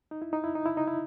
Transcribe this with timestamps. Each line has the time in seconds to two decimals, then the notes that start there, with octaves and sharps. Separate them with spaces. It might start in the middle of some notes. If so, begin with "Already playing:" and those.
0.11 D#4
0.22 E4
0.33 D#4
0.44 E4
0.55 D#4
0.66 E4
0.77 D#4
0.88 E4